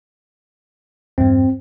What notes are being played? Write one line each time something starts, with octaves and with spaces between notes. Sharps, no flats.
E2 G2 C4